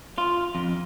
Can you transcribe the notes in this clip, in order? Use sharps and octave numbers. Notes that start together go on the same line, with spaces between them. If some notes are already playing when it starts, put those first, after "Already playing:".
F4
F2